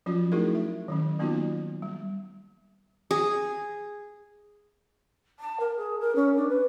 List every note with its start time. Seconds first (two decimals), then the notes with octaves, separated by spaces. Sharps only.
0.06 F3 F#3 C#4 F4 F#4
0.32 A3 D#4 E4 F#4 G#4 A#4
0.55 E5
0.88 D#3 F#3 C#4
1.19 F#3 A#3 B3 D#4 F4 F#4
1.82 G3
3.11 G#4
5.39 A5
5.60 A#4
5.77 G#4
6.00 A#4
6.15 C#4
6.36 D4
6.49 B4